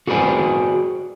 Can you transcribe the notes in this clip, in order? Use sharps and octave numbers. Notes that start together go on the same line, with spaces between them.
F#4 G#4 B4 C5 D5 G#5